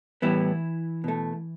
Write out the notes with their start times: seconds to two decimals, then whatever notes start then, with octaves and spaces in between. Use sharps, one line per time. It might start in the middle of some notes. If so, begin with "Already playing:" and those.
0.22 A2 E3 G3 B3 E4
1.04 B2 A3